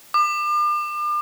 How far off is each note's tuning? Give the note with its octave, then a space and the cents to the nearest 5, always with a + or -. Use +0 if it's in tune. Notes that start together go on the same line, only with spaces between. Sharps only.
D6 +40